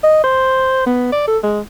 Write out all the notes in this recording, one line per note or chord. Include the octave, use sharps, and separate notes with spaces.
D#5
C5
B3
D5
A4
G#3